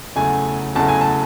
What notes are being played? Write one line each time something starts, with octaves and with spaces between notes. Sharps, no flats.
E2 C#3 F#3 A3 G#5
E2 C#3 F#3 A3 A5
G#5
A5